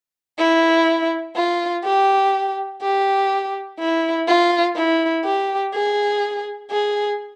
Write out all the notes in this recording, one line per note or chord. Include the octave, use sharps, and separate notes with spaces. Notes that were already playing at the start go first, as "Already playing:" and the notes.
E4
F4
G4
G4
E4
F4
E4
G4
G#4
G#4